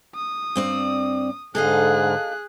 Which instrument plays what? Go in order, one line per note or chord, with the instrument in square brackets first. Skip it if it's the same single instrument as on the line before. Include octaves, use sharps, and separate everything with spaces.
[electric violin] D#6
[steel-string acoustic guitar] G2 C4 D5
[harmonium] G#2 D3 [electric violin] G#4 F#6 [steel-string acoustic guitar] A4 D#5 F5